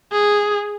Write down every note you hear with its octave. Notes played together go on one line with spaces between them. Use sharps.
G#4